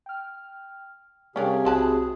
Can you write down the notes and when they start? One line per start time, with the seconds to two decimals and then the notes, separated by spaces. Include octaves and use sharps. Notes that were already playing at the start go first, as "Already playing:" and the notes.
0.06 G5 F6
1.36 C3 G3 C#4 D4 G#4 A#4 F5 G5
1.65 B1 G#3 F#4 A5 B5 F#6